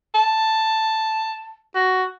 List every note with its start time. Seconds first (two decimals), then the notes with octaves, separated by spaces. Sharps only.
0.15 A5
1.75 F#4